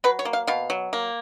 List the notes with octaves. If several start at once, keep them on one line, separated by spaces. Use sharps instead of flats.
F#3 B4
C#5
A#3
F5
B2 F5
F#3
A#3